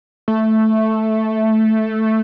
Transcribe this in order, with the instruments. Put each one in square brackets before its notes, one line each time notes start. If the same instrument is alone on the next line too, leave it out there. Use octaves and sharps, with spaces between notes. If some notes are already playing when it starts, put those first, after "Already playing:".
[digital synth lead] A3